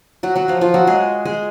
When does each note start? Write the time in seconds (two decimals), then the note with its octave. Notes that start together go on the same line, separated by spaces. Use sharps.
0.23 F#3 F#4
0.36 F#3 F#4
0.48 F3 F4
0.61 F3 F4
0.74 F#3 F#4
0.87 G#3 G#4
1.25 G#3 G#4